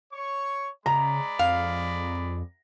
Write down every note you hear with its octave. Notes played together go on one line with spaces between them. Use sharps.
C#5 C#6
C#3 G#3 D5 A#5 B5
F2 F5